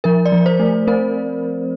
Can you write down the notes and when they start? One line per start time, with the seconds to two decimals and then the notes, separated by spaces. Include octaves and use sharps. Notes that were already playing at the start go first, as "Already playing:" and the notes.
0.04 F3 A#4
0.26 D5
0.32 F3
0.46 C5
0.60 A3
0.87 C4 A#4